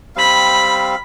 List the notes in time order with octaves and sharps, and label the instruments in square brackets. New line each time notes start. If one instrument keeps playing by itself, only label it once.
[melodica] G3 C4 F5 [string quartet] B5